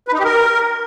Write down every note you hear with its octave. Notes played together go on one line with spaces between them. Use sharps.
B4
D#4
G4
A#4